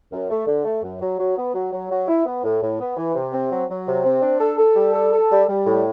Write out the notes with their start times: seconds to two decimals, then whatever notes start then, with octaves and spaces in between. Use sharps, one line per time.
0.12 F#2
0.30 A3
0.47 D3
0.65 A3
0.83 F#2
1.01 F#3
1.19 F#3
1.37 B3
1.55 F#3
1.72 F#3
1.90 F#3
2.08 E4
2.26 B3
2.44 A2
2.62 A2
2.80 B3
2.97 E3
3.15 C3
3.33 C4
3.51 F#3
3.69 F#3
3.87 C3
4.04 C4
4.22 D4
4.40 A4
4.58 A4
4.76 G3
4.93 A4
5.12 A4
5.30 G3
5.48 G3
5.66 A2